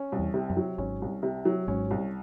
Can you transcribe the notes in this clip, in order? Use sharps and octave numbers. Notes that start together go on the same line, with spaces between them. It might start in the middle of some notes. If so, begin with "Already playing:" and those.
Already playing: C#4
C2
E2
C3
F#2
F#3
G#1 G#2 C#4
C2
C3
F#3
G#1 G#2 C#4
C2